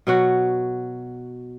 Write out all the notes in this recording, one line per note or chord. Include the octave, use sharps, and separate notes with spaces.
B2 F#3 F#4